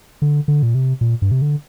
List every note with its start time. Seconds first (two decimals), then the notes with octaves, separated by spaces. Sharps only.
0.22 D3
0.48 D3
0.63 A#2
0.75 C3
1.01 A#2
1.22 G2
1.31 C3
1.42 D3